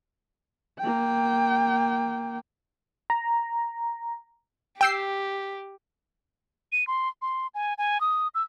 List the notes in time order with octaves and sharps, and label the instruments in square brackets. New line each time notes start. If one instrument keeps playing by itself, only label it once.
[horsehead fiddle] A#3 G5
[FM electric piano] A#5
[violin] G4 [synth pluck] G5 E6 C7
[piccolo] D#7
C6
C6
G#5
G#5
D#6
E6